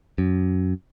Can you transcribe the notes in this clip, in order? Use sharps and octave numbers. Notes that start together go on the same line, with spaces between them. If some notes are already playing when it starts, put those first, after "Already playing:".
F#2